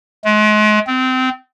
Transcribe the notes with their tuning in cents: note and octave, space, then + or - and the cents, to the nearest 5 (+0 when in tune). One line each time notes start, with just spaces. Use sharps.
G#3 +40
C4 -25